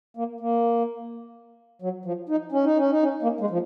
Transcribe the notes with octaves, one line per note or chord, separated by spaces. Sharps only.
A#3
A#3
F#3
F3
D#4
C#4
D#4
C#4
D#4
C#4
A#3
G#3
F3